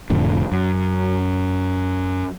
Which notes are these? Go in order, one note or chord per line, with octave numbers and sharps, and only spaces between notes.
F1 F2 A2 D3
F#2